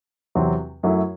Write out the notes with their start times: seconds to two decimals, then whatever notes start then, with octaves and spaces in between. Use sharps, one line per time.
0.35 E2 C3 F#3 C4
0.83 F#2 F#3 A3 E4